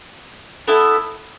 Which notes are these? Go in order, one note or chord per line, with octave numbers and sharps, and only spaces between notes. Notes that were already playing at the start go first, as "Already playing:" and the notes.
B3 E4 A4